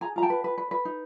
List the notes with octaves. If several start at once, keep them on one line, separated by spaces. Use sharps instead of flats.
G#4 G#5 A#5
F4 A#5
G5 A5
B4
B4
B4
B4
D#4